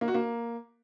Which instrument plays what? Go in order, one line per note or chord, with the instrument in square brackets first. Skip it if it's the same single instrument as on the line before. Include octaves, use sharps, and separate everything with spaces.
[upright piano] A#3
F#4
A#3